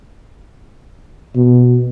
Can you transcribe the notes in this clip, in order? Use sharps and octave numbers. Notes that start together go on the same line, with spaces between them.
B2